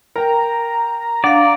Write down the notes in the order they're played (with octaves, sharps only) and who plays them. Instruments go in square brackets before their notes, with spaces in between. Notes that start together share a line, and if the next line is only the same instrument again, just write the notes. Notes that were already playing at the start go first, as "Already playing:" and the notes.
[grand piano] A#4 G5 [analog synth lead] A#5
[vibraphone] D4 F5 [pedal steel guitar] D5 [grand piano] F#5